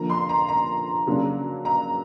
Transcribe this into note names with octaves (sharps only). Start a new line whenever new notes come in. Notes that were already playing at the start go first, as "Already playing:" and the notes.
Already playing: D3 F3 A#3 A#5
C6
A#5
A#5
C#3 F#3 A#3 D4
A#5